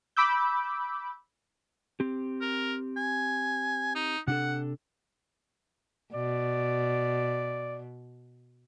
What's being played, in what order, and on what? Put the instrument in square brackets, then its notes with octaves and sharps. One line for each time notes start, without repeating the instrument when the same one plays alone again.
[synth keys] B5 D6 E6 G6
[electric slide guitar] C4 G4
[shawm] A#4
G#5
D#4
[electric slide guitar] C3 D4 A4 [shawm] F#5
[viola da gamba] B2 [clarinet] D5